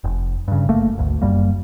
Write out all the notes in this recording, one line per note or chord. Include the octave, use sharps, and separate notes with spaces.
F1
G2 C#3
F#1 A3 A#3
G#1 D2
F#1 F#2 G3 A#3